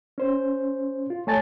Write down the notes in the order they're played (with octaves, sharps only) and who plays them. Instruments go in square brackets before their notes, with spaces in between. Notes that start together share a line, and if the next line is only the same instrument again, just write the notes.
[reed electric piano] C#4 C5
F4
A3 C#5 G#5 A5 A6